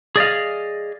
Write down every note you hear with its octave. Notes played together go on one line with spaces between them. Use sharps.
G#4 D5 D#5 F5